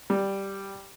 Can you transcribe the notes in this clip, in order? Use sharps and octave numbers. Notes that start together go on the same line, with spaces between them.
G3